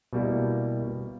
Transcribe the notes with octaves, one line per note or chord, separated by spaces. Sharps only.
B2 G3 A#3 E4